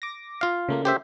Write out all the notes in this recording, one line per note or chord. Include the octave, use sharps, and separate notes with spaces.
D6 A#6
F4 F5
C#3 A3 A#3
G4 C5 E5